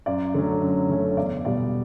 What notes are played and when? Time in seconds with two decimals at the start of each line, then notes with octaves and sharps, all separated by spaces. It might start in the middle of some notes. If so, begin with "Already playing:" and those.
0.06 F#2 D5
0.34 D3 F#3 A3 C#4
0.62 F#2
0.89 D3 F#3 A3 C#4
1.09 C#5
1.17 E2 D5
1.45 B2 G3 D5